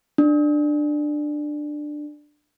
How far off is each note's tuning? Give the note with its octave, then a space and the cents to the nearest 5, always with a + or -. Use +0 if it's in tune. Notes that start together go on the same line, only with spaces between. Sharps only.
D4 +15